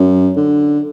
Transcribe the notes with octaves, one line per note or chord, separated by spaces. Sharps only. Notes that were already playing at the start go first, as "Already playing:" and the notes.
Already playing: F#2
D3